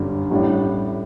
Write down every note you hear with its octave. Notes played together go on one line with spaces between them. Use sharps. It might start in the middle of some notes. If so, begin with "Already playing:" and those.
Already playing: G1 F#2 D3 G3 D4
A1 A2 G3 D4